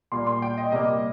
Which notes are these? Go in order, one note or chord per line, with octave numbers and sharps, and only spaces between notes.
A#2 G3 A#3 C6
C6
G5
D#5
C3 G3 A#3 D#5